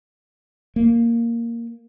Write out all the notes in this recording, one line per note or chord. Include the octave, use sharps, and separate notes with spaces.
A#3